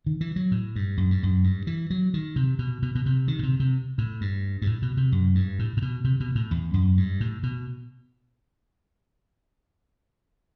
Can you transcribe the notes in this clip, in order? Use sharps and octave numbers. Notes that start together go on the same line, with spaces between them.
D#3
E3
F#3
A2
G2
F#2
G2
F#2
G2
E3
F#3
D#3
C3
B2
B2
B2
C3
D#3
B2
C3
C3
A2
G2
G2
A2
B2
C3
F#2
G2
A2
A2
B2
C3
B2
A2
E2
F#2
G2
A2
B2